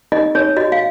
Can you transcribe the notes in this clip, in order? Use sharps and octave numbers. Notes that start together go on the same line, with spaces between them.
D#4 D#5
D#4 C#5
F#4 D#5
F5